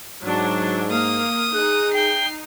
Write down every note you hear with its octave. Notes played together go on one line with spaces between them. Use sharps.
G#2 F#3 D4
A#3 F5 D#6
D#4 G#4 F#6
G5 C7